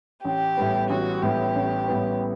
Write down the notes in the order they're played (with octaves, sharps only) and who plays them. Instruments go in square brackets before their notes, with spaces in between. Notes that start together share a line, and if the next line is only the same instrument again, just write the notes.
[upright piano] A1 [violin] G4
[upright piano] A2 G3 B3
[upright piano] A1 [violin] F#4
[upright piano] A2 G3 B3 [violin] G4
[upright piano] A1
A2 G3 B3